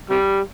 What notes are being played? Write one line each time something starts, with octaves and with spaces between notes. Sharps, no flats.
C3 G3